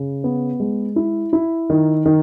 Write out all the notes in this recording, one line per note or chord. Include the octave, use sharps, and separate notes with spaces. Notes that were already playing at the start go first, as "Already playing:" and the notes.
Already playing: C#3
B3
G#3
E4
E4
D#3
D#3